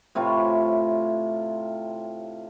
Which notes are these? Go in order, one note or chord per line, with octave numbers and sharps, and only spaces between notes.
A2 C3 F4 C#5